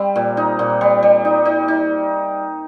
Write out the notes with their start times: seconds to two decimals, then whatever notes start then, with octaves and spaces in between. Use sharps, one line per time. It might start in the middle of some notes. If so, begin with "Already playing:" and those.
Already playing: G3 C4
0.16 A#2
0.37 D#4
0.59 A#2
0.81 G3
1.03 G3
1.25 D#4
1.45 D#4
1.68 D#4